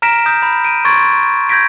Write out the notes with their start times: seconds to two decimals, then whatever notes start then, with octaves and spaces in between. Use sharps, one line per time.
0.02 A#5 F6 A#6 B6 D7 E7
0.26 D#6 G6 A#6
0.43 B5
0.65 D7 D#7
0.85 C6 C#6 G#6 A6 D7
1.49 G6 G#6 A#6 B6 D7